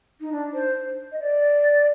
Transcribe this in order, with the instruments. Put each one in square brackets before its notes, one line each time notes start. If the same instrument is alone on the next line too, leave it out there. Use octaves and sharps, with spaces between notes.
[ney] D#4
D4
C5
D#5
D5